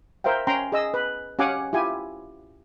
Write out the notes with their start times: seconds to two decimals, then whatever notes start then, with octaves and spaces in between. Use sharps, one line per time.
0.24 A#4 C5 E5 F5 G5
0.47 C#4 G5 A#5 C6
0.72 G#4 D#5 E6
0.94 B4
1.39 C#4 G4 F5 F#5 G#5 D6
1.73 E4 F4 G4 G#5